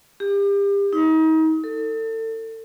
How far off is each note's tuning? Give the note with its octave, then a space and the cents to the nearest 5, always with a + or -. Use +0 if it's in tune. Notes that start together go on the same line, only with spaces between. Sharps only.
G4 +35
D#4 +35
A4 +30